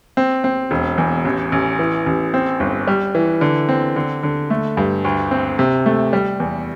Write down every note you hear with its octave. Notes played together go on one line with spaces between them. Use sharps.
C4
C4
E1
E2
A1
A1
E3
A1
C4
G1
G3
E3
D3
C4
D3
D3
A3
G2
D2
C4
C3
A3
G3
E2